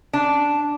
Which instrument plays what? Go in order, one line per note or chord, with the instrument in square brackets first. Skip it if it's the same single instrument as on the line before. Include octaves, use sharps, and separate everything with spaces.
[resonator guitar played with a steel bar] D4